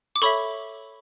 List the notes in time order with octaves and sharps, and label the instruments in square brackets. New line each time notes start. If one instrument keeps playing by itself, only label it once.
[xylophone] D6
A4 C#5 E5 B5 C#6